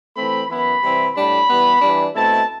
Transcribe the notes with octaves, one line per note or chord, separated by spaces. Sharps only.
E3 A3 C4 B5
F#2 E3 B3 E4 B5
C3 E3 G3 C4 E4
A2 G3 D4 B5
E3 G3 B3
E3 G3 D4
B2 A3 C4 E4 A5